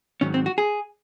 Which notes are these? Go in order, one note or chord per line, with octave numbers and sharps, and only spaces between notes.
G#2 D#3 F#3 C#4
C4
F#4
G#4